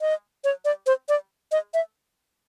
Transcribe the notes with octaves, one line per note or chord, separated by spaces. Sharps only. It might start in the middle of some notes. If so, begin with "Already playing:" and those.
D#5
C#5
D5
C5
D5
D#5
E5